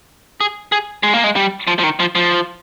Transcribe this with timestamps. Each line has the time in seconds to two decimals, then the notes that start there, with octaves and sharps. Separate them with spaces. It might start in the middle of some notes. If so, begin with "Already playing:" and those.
0.41 G#4
0.72 G#4
1.03 G#3
1.14 A#3
1.24 G#3
1.36 G3
1.67 F3
1.79 F3
1.84 D#3
2.00 F3
2.15 F3